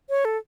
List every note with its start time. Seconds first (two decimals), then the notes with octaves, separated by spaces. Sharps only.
0.09 C#5
0.25 A4